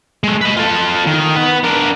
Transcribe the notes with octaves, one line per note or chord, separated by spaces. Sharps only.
G#3 A3
B4 D#5
F4 A4
D#3
B3 B4
D4 A#4